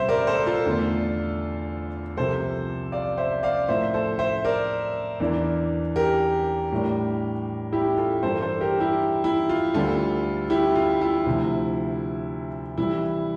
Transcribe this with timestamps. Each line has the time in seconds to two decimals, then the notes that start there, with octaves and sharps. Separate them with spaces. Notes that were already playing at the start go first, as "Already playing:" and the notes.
Already playing: C2 A#2 G3 C5 E5
0.09 A#4 D5
0.27 A4 C5
0.46 F4 A4
0.66 E2 D3 A3 D4
2.17 C2 C3 F3 A#3 A4 C5
2.92 D5 F5
3.18 C5 E5
3.43 D5 F5
3.69 A2 F3 A#3 C5 E5
3.94 A4 C5
4.19 C5 E5
4.45 A#4 D5
5.20 E2 E3 A#3 D4
5.96 G4 A#4
6.72 A2 G3 A#3 D4
7.72 E4 G4
7.97 F4 A4
8.23 G2 E3 A#3 D4 A4 C5
8.42 A4 C5
8.60 G4 A#4
8.80 E4 G4
9.24 E4
9.49 F4
9.74 D2 D3 G3 F4 A4
10.50 E4 G4
10.75 F4
11.01 E4
11.26 D2 C3 F3
12.78 C3 E3 G3 E4